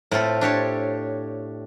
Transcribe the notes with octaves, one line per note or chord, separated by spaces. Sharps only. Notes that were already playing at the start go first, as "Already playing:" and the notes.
A2 C4 F4 A4 B5
D4 G4 C#5 A5